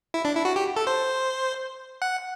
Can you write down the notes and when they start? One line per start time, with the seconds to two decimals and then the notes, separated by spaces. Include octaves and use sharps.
0.14 E4
0.25 D4
0.35 E4
0.45 F#4
0.56 G4
0.76 A4
0.87 C5
2.02 F#5